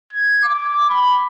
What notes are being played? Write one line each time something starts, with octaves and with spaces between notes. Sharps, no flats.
G#6
D6
B5